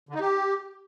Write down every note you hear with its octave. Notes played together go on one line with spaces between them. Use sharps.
D3
D#4
G4